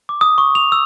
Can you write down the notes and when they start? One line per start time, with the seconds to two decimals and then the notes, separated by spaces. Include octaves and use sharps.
0.09 D6
0.21 D#6
0.38 C#6
0.55 F7
0.72 E6